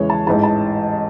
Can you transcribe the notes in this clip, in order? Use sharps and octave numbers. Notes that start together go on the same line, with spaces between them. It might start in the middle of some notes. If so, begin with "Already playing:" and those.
Already playing: E2 C#3 E3 G#3 C#5
A5
A1 G#2 E3 G#3 A5
A5